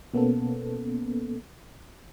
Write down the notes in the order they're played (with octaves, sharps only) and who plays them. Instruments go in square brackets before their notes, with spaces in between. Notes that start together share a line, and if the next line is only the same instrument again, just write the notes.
[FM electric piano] B2 A#3 B3 C#4 A4